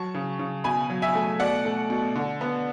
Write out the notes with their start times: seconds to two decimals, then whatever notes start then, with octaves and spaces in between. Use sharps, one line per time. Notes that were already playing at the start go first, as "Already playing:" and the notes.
Already playing: F#3 A5 C#6
0.14 C#3
0.39 C#3
0.64 B2 G#5 B5
0.90 F#3
1.02 E5 G#5
1.15 A3
1.40 B2 D5 F#5
1.65 A3
1.90 B2
2.16 D3
2.41 B3